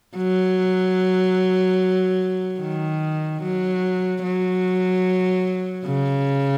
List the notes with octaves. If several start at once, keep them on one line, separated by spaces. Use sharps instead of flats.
F#3
D#3
F#3
F#3
C#3